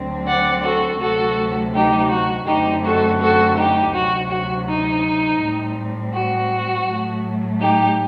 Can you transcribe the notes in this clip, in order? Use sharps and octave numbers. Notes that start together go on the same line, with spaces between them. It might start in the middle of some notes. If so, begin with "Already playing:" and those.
Already playing: D2 D3 F#3 C4
D5 F#5
F#4 A4
D2 C3 F#3 A3 F#4 A4
D#4 G4
F#4
F#2 D3 A3 C4 D#4 G4
F#4 A4
F#4 A4
D#4 G4
D2 C3 F#3 F#4
F#4
D#4
A2 G3 C4
F#4
A2 F#3 A3
D#4 G4